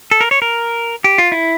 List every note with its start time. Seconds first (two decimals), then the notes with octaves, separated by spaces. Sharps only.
0.11 A4
0.21 A#4
0.31 C#5
0.42 A#4
1.04 G4
1.18 F4
1.32 E4